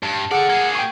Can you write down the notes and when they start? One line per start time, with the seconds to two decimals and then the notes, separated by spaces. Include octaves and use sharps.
0.03 G2 A5
0.31 G#4 A4 D5 F#5 F6
0.49 A#3 G#4 G#6
0.75 G5 C#6